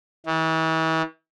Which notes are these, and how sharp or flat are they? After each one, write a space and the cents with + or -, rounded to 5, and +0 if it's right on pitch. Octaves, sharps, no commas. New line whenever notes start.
E3 -40